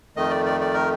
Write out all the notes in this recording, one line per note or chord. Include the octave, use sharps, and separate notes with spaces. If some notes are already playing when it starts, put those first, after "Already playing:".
F2 D#3 A3 D#5
D5
D5
D5
A#4